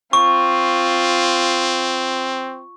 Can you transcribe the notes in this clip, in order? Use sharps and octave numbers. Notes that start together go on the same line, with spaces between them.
C4 F4 C#6